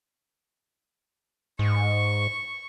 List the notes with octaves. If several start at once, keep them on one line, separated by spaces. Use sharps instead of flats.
G#2 C#6